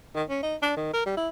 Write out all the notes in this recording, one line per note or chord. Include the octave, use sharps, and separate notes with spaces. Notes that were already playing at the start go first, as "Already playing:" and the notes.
D#3
C#4
D#4
D4
D#3
A#4
G3
E4